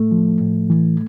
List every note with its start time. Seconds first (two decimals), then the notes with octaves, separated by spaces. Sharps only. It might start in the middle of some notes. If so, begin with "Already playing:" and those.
Already playing: A2 A3
0.12 F3
0.41 A2
0.70 E3